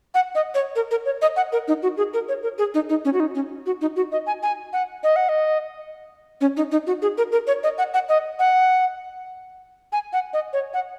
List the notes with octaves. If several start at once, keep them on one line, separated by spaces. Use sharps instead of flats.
F#5
D#5
C#5
A#4
A#4
C#5
D#5
F#5
A#4
D#4
F#4
G#4
A#4
C#5
A#4
G#4
D#4
D#4
C#4
F#4
D#4
C#4
F#4
D#4
F#4
D#5
G#5
G#5
F#5
D#5
F#5
D#5
C#4
D#4
D#4
F#4
G#4
A#4
A#4
C#5
D#5
F#5
F#5
D#5
F#5
G#5
F#5
D#5
C#5
F#5